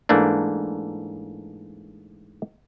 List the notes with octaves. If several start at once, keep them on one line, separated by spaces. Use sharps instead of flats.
G#2 E3 A3 A#3 D4